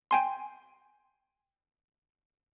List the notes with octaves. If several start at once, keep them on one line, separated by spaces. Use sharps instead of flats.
G5 G#5 C6